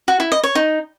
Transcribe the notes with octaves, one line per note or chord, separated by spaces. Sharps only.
F#4
E4
D#5
C#5
D#4